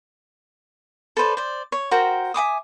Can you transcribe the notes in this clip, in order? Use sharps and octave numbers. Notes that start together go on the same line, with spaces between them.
A4 B4 C5 D5
C5 D5
C#5
F#4 A#4 C5 G5
E5 G#5 D6 D#6